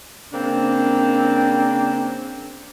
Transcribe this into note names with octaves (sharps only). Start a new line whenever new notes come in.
C#3 A#3 C4 D4